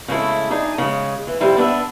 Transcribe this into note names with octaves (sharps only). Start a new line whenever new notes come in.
C#3 G#3 A3 E4
D4 D#4 G#4
C#3 G#3
E3
F2 C3 G3 C4 E4
B3 D4 C#5 E5